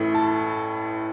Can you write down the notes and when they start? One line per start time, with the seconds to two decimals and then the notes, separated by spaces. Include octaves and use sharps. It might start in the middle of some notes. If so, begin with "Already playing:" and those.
Already playing: A1 A2 A3 E4
0.14 A5